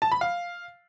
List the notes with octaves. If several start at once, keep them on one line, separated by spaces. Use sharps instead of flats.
A5
B5
F5